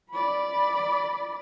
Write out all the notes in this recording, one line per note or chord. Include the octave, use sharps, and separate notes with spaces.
D5 B5